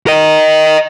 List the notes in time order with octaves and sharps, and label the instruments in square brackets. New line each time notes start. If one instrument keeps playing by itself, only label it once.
[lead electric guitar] A#4 D#5